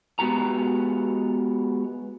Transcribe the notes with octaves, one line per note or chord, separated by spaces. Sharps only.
G#3 B3 F#4 G4 A#5